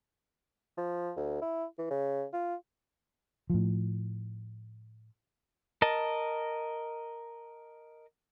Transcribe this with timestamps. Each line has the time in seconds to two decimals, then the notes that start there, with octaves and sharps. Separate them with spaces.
0.77 F3
1.16 D2
1.42 E4
1.78 E3
1.90 C#3
2.33 F4
3.50 A2 F3
5.82 A#4 D#5 A5